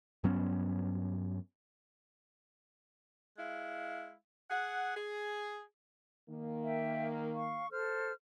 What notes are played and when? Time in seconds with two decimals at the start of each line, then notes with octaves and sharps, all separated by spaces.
0.24 G2 F#3 B3 C#4
3.37 G#3 E4 F5
4.50 G#4 F#5
4.95 G#4
6.29 D#3 A#3
6.63 E5 G5
7.34 F5 C#6
7.71 A4 C5 F6